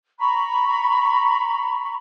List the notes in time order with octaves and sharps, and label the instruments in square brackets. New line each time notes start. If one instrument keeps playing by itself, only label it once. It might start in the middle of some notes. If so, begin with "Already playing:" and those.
[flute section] A#5 B5 C#6